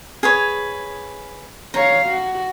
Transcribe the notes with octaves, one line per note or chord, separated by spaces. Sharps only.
G#4 B4 C#5
C#5 F5 A#5
F#4